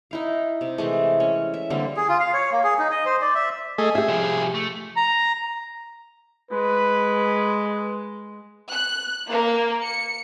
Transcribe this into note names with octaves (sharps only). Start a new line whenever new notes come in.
D#4 E4 F5
C3
E3 G#3 A3
C#4
E5
D3 G3 A#3 C4
G#4
F4
F5
C#5
A#3
G#4
D#4
D#5
C5
D5
E5
A3 G#4 D#5
G4 G#4 E5
C2 F3
A3
A#5
G#3 B4
F#6
A#3
C#7